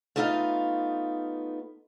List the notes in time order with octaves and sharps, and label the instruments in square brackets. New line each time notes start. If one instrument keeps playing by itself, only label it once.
[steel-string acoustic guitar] A3 B3 D#4 F4 E5 F5